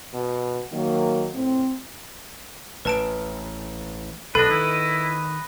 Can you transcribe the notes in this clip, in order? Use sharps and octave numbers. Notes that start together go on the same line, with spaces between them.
B2
D#3 F#3 A#3
A2 C4
A1 B4 A5 D7
B1 D4 A4 B4 D#5
D#3 E4